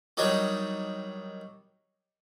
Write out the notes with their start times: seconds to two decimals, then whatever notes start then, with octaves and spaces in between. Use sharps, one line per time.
0.17 D#3 F#3 G3 D4 D#4 C#5